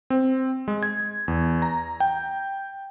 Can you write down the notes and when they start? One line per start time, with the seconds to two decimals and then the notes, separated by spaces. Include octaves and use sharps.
0.10 C4
0.68 G#3
0.83 G#6
1.28 E2
1.62 A#5
2.00 G5